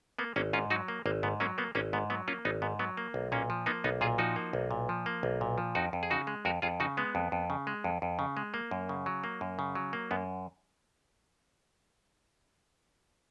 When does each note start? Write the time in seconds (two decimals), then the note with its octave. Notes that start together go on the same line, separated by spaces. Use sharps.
0.19 A#3 B3
0.36 G#1 A#3 C#4
0.53 G#2 C#4 F4
0.70 F#3 D#4 F#4
0.88 A#3
1.06 G#1 A#3
1.23 G#2 B3
1.40 F#3 A#3 C#4
1.58 A#3 B3
1.75 G#1 A#3 C#4
1.93 G#2 B3
2.10 F#3 B3
2.28 A#3 C#4 F4
2.45 G#1 B3 D#4
2.62 G#2 B3
2.79 F#3 B3
2.97 A#3
3.14 B1
3.32 A#2 A#3 C#4
3.50 F3
3.66 A#3 B3 D#4
3.84 B1 B3 D#4
4.01 A#2 F4 G#4
4.18 F3 D#4 F#4
4.36 A#3
4.53 B1
4.71 A#2
4.89 F3
5.06 A#3
5.23 B1
5.41 A#2
5.58 F3
5.75 F2 D#4 F#4
5.93 F2
6.03 G#4
6.10 C#3 D#4 F#4
6.27 G#3
6.45 F2 F#4 A#4
6.62 F2 F4 G#4
6.80 C#3 D#4 F#4
6.97 G#3 B3
7.15 F2
7.32 F2
7.50 C#3
7.67 G#3
7.84 F2
8.02 F2
8.19 C#3
8.37 G#3
8.54 A#3
8.71 F#2
8.89 C#3
9.06 F#3
9.24 A#3
9.41 F#2
9.59 C#3
9.75 F#3
9.93 A#3
10.11 F#2 B3